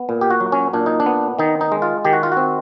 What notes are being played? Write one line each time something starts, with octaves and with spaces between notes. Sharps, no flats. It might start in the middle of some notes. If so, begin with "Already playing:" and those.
Already playing: B3
A#2
G4
F#4
F#3
C#4
A#2 D4
D#4
D4
B3
D#3 D#4
D#4
G#3
F4
D#3 G4
F#4
F4
F#4
C4